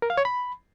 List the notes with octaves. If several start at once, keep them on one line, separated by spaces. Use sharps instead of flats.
A#4
F5
C#5
B5